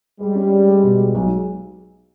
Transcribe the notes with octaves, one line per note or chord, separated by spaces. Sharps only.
G3 G#3
C#4
G#3
G#3
B2
G#3
B1